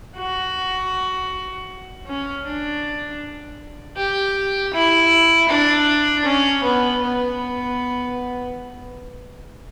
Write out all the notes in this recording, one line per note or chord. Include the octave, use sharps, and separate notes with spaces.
F#4
C#4
D4
G4
E4
D4
C#4
B3
B3